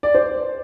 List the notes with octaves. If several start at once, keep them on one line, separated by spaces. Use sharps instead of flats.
D5
C5